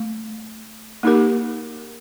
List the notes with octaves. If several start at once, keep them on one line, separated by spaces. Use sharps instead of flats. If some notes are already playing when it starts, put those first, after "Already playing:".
Already playing: A3
A#3 D#4 G4 A#4